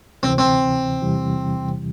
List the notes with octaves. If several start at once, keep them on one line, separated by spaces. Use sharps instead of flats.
D2 C3 E3 C4
C4
E2 C3 E3 G3